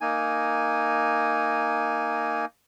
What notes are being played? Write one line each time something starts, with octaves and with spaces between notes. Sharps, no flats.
A#3 D#4 G#5